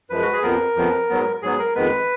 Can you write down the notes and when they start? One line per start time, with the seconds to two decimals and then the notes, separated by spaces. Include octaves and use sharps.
0.10 F#2 F3 G#3 B4
0.22 F#4
0.33 G#4
0.43 F2 F3 B3 A#4
0.76 F2 F3 B3
1.10 G#2 F#3 B3
1.42 G#2 F#3 B3 G#4
1.59 A#4
1.75 F2 D#3 G#3 B3 B4